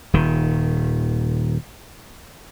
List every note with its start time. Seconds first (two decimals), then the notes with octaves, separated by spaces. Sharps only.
0.13 D#1 D#3